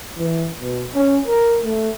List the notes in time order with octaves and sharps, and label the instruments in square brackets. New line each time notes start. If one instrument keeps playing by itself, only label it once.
[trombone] E3
B2
C#4
A#4
A3